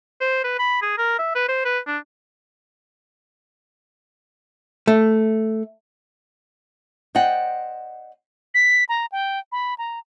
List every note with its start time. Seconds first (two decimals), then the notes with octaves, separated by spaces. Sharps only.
0.21 C5
0.44 B4
0.59 B5
0.82 G#4
0.98 A#4
1.19 E5
1.35 B4
1.48 C5
1.65 B4
1.87 D4
4.87 A3
7.15 C5 D5 D#5 F#5 G5
8.54 B6
8.89 A#5
9.12 G5
9.52 B5
9.78 A#5